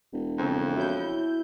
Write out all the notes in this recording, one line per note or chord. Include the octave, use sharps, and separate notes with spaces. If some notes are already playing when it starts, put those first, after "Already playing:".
E1
F2 C#3 C4
E4 F#4 C#5 G6